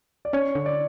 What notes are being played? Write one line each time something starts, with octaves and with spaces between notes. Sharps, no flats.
D5
C#4 C#5
D3
D5